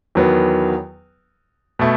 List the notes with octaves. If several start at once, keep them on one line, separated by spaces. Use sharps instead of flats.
E2 D#3 F#3 B3
B2 A3